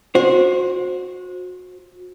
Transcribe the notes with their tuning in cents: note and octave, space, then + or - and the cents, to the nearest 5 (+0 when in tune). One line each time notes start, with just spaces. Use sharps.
F#4 -30 C5 +15